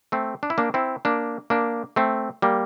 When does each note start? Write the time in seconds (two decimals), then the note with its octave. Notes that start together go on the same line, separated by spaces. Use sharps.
0.12 A3 C4
0.43 D4
0.50 E4
0.58 A#3 D4
0.74 C4 E4
1.05 A#3 D4
1.50 A#3 D4
1.96 A3 C4
2.42 G3 A#3